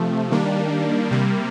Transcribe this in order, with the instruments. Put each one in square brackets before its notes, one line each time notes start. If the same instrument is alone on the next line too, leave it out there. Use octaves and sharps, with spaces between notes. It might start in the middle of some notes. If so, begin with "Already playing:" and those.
Already playing: [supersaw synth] C3 F3 A3
D#3 G3 A#3 D4
C3 G3 A#3